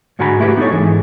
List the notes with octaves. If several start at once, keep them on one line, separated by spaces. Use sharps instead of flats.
G#2 D3 F#4 G#5 A#5 B5
A3 E4 F#4 G4 B4
B3 D#4 E4 A4 C#5
G#2 E3